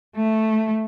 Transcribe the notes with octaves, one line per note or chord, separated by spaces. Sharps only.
A3